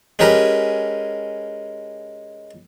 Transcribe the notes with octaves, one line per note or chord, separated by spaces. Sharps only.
G#3 C#4 G4 A#4 B4